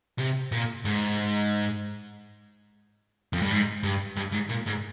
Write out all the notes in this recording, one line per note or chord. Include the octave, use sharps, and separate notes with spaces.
C3
A#2
G#2
F2
G2
G#2
G2
G2
G#2
A#2
G#2